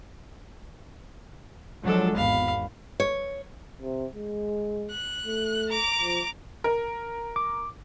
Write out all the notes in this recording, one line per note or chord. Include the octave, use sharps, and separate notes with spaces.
F3 F#3 G#3 D4 A4
G#1 E2 F5 B5
C#5
C3
G#3
F#6
A3
A#5 D6
F3
A#4
D6